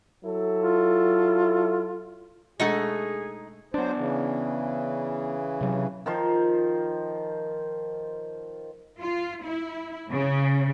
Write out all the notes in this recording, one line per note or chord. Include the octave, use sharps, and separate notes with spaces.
F#3 E4 A4
F4
B2 G#3 A3 D4 D#4 G#4 F#5 C#6
F#3 B3 D4 C5
C#3 E3
C3 F#3
D#3 F3 C5
F4
E4
C#3